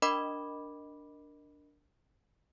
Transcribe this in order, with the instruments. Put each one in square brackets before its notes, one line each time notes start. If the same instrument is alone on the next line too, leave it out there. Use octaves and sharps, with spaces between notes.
[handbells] D4 A#4 D#5 B5 D6